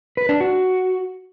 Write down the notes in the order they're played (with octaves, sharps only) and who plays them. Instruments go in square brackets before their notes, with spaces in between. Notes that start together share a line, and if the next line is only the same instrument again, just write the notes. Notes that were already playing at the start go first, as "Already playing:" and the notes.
[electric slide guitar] B4
D4
F#4